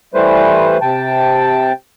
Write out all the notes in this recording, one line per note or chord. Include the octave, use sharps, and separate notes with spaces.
E3 G3 A3 B4 C5
C3 G5 A5